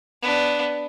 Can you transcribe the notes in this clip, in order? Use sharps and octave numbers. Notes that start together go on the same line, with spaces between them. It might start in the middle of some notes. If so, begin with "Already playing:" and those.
B3 D4